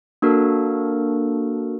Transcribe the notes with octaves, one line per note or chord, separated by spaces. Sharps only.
A#3 D4 F#4 A4 A#4